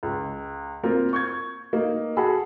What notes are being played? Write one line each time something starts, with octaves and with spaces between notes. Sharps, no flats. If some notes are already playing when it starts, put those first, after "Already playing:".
C#2
A#3 C4 F4 A#4
C#6 G6 G#6
A#3 D#4
F#4 G#4 A4 F#5 B5